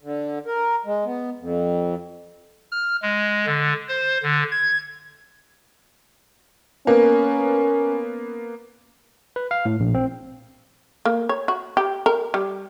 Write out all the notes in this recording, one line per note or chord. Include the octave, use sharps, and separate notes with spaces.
D3
A#4
G#3
B3
F2
F6
G#3
D3
C5
D3
G#6
A#3 B3 C#4
B4
F5
A2
A#1
C4
A#3
C#5
F#4
G4
A#4
G3